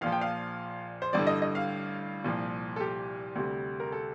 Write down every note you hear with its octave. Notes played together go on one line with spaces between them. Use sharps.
A#1 A#2 F3 F5
G5
F5
C5
A1 G2 D3 D5
D#5
D#5
F5
C2 A#2 F3
A4
G4
D2 C3 G3
A#4
A4